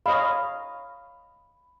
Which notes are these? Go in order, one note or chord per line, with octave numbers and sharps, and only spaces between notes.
C#5 D#5 F5 B5